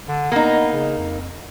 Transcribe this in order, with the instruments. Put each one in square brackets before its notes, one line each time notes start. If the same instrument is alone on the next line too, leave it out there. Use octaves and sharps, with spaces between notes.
[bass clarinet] D3
[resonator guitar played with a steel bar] A#3 D#4 [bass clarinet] B3
[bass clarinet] C#3
F2